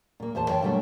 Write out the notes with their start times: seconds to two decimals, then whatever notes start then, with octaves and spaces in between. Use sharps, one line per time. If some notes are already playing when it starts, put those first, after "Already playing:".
0.20 A#2 A#3
0.35 E2 A#2 C5 A5
0.49 E3 F4 C#5 E5 G5 A5
0.62 A#2 D3 F#3 G3 A3 B3